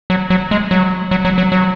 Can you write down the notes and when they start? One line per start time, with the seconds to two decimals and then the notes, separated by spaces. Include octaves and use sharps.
0.10 F#3
0.30 F#3
0.51 G#3
0.71 F#3
1.11 F#3
1.25 F#3
1.38 F#3
1.52 F#3